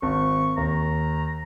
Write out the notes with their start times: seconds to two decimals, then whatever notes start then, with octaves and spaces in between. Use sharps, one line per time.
0.02 G#1 C#6
0.57 D#2 A#5